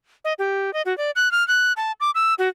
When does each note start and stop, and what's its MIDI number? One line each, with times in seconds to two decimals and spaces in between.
0.25 0.33 75
0.39 0.73 67
0.74 0.82 75
0.86 0.96 66
0.98 1.11 74
1.16 1.31 90
1.31 1.46 89
1.48 1.73 90
1.77 1.92 81
2.00 2.11 86
2.15 2.34 88
2.39 2.49 66